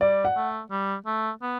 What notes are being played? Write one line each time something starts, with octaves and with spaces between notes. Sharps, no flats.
G3 D5
F#5
A3
G3
A3
B3